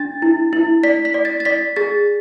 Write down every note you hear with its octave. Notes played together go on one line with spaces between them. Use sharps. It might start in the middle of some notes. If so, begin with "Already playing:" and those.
Already playing: D4 A6
E4
E4
D5 B6
B6
D5
A6
A6
D5 B6
G#4 A6